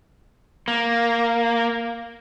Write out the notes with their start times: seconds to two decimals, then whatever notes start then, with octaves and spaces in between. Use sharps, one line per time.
0.68 A#3